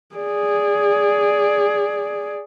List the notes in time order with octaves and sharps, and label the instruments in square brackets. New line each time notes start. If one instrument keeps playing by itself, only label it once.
[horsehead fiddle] G#4 D5